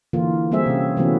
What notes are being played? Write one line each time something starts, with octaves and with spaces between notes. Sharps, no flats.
D3 E3 A#3 F4
G3 A#3 C4 G#4 E5
C3 C#4
C3 E3 F#3 A3 B3 C#4